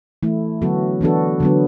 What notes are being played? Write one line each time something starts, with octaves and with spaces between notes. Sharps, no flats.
E3 A3 E4
D3 F#3 B3 F#4 A4
E3 B3 D4 F#4 A4
D3 F#3 B3